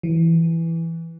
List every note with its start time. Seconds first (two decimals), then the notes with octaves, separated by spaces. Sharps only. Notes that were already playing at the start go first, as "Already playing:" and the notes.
0.03 E3